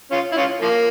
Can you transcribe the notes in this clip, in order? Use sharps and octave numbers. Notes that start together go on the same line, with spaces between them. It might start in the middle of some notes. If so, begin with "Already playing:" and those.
C#4 F4
E4
C#4 F4
F3 A#3